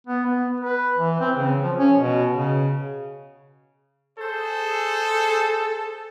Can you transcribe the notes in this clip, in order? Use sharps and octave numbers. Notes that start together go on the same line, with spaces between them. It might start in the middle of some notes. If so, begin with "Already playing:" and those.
B3
B3
B4
E3
C4
C#3
F3
C#4
B2
C#3
G#4 A4 C5